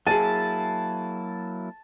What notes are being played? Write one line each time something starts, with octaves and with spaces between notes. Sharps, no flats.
F#3 A#3 E4 G#4 A5 D#7